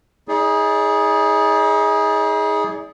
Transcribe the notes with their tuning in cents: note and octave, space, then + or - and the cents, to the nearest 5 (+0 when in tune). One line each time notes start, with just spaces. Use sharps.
D#4 +45 G#4 +0 D5 -20